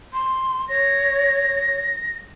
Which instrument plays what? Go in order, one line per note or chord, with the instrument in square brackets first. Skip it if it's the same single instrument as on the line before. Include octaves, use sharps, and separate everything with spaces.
[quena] C6
[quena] C#5 [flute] A#6